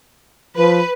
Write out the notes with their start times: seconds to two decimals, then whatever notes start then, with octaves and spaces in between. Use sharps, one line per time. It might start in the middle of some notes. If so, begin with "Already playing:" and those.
0.57 F3 B4